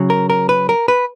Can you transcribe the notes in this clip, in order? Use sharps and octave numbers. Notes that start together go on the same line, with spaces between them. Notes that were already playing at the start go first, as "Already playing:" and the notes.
Already playing: C#3 F#3
A#4
A#4
B4
A#4
B4